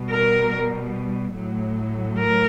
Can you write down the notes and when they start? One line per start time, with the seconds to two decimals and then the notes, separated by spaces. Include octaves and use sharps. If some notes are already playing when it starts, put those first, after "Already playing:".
Already playing: B2 G3
0.11 A#4
1.35 A2 F#3
2.18 A#4